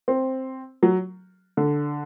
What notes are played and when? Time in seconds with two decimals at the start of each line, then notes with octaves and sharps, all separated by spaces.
0.08 C4
0.83 F#3
1.57 D3